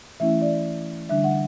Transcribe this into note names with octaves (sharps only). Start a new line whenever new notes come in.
E3 A3 C#4 E4 E5
D5
D3 G3 D4 E5
F#5